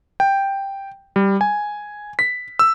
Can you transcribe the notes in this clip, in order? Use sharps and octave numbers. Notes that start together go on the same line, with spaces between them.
G5
G3
G#5
B6
E6